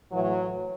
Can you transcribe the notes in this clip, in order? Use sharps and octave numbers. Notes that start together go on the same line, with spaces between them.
A2 E3 F#3